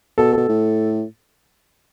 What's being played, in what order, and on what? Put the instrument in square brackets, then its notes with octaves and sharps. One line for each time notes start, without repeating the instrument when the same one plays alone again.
[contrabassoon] B2 [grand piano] A4
[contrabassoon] B2 [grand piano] A4
[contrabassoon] A2